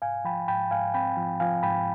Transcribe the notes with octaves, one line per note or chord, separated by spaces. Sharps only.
G#2 F5 G#5
F3 G5 B5
G#2 G5 B5
G#2 F5 G#5
C4 G5 B5
F3
F3 F5 G#5
G#2 G5 B5